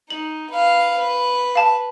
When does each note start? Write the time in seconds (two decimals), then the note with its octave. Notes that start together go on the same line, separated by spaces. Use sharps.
0.10 D#4 F#7
0.50 B4 F5
0.99 B4
1.55 F5 A5